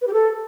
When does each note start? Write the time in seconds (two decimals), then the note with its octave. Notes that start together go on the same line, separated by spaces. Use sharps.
0.01 B4
0.07 G4
0.13 A4